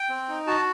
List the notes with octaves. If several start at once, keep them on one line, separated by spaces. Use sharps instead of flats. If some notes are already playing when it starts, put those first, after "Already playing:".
Already playing: G5
C4
D#4
F#4 A5